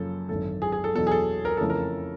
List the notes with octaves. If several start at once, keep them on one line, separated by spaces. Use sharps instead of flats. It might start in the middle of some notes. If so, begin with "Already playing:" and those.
Already playing: F#2 C#3 F3 A#3 A4
G#1 F#2 D3 A4
G#4
G#4
A4
E2 B2 F#3 A4
G#4
A4
A#4
F2 C#3 E3 A3 A4
A#4